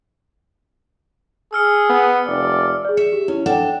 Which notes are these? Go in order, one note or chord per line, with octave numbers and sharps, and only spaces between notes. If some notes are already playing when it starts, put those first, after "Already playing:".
G#4 E6 F6 C#7
B3
F1 D5
G#4 D5
E5 C#7
G4
C#4 E4
D4 A4 F#5 G5